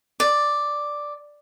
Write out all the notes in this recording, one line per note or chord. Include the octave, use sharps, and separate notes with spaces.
D5